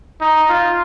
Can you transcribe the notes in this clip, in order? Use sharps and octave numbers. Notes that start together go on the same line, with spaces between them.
D#4
F4